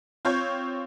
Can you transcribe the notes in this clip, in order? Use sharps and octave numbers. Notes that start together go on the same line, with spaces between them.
C4 F4 C#5 G6